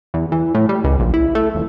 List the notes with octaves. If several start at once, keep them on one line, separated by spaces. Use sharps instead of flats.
E2
E3
A2
G3
C#2
A#1
E4
A3
D#1